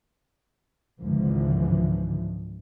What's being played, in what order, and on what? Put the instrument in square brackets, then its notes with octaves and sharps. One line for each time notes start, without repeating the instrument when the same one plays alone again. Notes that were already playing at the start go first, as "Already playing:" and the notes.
[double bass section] G#1 C#2 G#2 D3 E3 F3